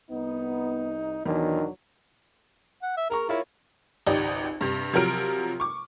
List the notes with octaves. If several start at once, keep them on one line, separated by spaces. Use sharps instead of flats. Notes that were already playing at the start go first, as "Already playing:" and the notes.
C2 B3 D#4
E2 B2 D#3 F#3 D4
F#5
E5
G#4 A#4 A#5 C#6
E4 F4 A#4 C#5
G#1 C#2 D#4 G4 D5
G2 C3
C3 F3 F#3 A#4 F6 D7
C#6 D6